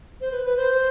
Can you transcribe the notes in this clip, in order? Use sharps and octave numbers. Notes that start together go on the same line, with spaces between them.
C5
B4
B4
C5